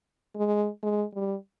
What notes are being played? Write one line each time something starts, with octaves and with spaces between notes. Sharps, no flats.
G#3
G#3
G3